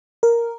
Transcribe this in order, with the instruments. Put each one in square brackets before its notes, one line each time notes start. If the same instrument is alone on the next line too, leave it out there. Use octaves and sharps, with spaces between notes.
[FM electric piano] A#4